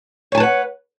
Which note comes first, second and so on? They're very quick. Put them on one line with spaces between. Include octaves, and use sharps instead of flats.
C#5 G#5 A5 B4 F#5